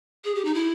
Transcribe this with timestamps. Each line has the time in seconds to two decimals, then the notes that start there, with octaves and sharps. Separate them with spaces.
0.25 G#4
0.35 G4
0.45 D#4
0.54 E4